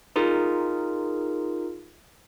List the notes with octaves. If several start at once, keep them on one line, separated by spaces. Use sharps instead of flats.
D#4 F4 G#4 A#4